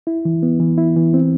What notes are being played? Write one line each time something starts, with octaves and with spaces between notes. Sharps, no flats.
E4
E3
B3
E3
E4
E3
C4